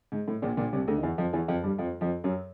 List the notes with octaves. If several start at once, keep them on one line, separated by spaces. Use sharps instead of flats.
G#2
A2
A#1 A#2
A#1 A#2
C2 C3
D2 D3
D#3
E2 E3
F2 F3
E2 E3
F2 F3
G2 G3
F2 F3
F2 F3
F#2 F#3